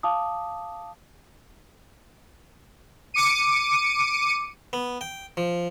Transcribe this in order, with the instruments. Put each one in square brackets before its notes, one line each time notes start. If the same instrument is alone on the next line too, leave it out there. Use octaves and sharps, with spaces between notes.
[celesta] F5 A5 D6 D#6
[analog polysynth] D6 C#7 D#7
[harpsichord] B3
G5
F3